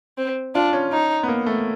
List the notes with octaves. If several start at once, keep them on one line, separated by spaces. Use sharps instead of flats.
C4
D4 F4
C#4
D#4
B3
A#3
A3